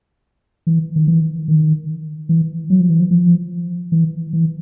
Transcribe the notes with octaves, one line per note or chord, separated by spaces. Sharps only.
E3
D#3
E3
D#3
E3
F#3
F3
E3
F3
F3
E3
E3